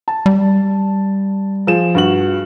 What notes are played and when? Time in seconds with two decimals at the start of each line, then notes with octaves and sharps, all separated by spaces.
0.08 A5
0.26 G3
1.67 F3 G#4 E7
1.95 G2 F#4 F#7